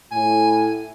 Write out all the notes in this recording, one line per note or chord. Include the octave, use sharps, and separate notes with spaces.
A2 G#5